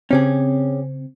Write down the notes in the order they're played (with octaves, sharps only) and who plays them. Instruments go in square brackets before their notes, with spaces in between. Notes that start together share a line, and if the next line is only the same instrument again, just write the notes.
[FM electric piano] C#3 C4 [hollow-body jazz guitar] C#4 G4 G#4